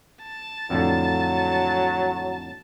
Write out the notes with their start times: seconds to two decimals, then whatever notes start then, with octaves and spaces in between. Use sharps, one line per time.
0.22 A5
0.70 F2 A2 D3 F#3